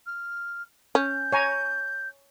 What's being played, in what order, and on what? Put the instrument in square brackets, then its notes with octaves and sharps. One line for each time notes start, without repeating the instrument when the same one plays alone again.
[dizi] F6
[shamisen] C#4 [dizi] G6
[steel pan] C#5 G#5 A#5